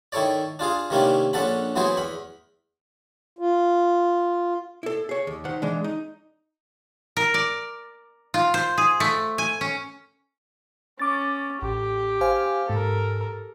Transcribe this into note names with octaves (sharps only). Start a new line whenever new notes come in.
D#3 E4 A4 C#5 D5
D4 F4 G#4 F5
C3 D#3 A#3 C#4 D4 E4
A#1 C#4 D4 A4 F#5 B5
E3 F#3 B3 E4 G#4 C5
E2 B5
F4
E4 A4
G#4 C#5
D#2
D#3 C5 F#5
E3 G#3 D4
D#4
A#4
D5
F4
C5
G#4
A3
G#5
C#4
C#4 C#6 D6 A6
A1 G4
C5 F5 G#5
G#2 A4 A#4